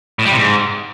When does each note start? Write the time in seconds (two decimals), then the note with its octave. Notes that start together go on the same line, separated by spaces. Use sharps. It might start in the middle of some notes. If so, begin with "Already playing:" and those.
0.19 A2
0.25 G3
0.31 C3
0.38 G#2